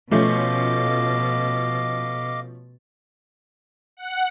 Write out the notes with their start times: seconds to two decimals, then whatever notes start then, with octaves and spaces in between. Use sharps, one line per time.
0.11 B2 F3 A3 C#4 D#5 F5 D6
3.97 F#5